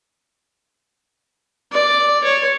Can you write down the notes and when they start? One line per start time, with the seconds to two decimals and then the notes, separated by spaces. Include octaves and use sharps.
1.72 D5
2.24 C#5